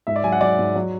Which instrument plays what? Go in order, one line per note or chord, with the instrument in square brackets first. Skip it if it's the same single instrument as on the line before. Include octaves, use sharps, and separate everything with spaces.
[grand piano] G#2 E5
D5
F#3 G#5
F#5
F#3 D5
G#2
F#3